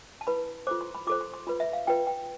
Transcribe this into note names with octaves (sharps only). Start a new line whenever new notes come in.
A5
E4 B4 B5
F4 A4 C5 D6
C6
B5
F4 A4 C5 D6
C6
C6
F4 B4 B5
E5
F5
F4 B4 G5
G5